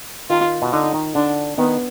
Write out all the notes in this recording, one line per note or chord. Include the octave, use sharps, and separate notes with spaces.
D#3 F4
B2
D3 D#4
D#3
D3 D4
D#3 B3